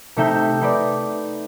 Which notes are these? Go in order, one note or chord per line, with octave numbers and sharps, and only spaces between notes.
C3 A3 D#4 E5 G5 E6
D#4 B4 D5